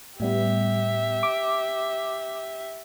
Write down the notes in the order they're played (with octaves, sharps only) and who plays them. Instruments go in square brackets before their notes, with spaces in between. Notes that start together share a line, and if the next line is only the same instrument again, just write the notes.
[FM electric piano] A2 G3 B3 [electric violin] G4 E5
[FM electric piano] D6